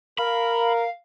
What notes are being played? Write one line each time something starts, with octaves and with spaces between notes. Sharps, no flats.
A#4 F5 B5